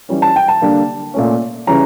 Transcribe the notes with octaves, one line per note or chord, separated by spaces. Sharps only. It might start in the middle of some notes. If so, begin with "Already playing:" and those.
E3 G3 C#4
A5
G5
A5
D3 G3 A#3
A#2 A3 C#4
C#3 E3 G3 C#4 A#5